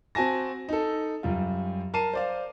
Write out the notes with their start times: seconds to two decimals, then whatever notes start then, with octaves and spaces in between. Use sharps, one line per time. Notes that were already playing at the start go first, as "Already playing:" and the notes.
0.15 C4 F#4 G#5 A5 A#6
0.69 D#4 A4
1.23 F#2 G3 F4
1.94 A#4 A5 C7 D#7
2.13 C5 D5 F5